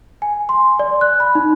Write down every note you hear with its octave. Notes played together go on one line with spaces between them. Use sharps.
G#5
C6
D5
F#6
B5
D#4